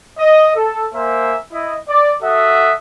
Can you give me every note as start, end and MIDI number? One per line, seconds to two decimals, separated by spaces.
0.19 0.52 75
0.56 0.86 69
0.94 1.36 58
0.94 1.36 70
0.94 1.36 72
0.94 1.36 76
0.94 1.36 80
1.53 1.76 64
1.53 1.76 75
1.89 2.13 74
2.23 2.72 66
2.23 2.72 69
2.23 2.72 76
2.23 2.72 78
2.23 2.72 87